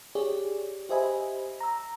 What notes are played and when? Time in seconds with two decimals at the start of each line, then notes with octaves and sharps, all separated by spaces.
0.15 G4 G#4 C#5 D5
0.89 G4 C5 D#5 E5 G#5 B5
1.61 A#5 E6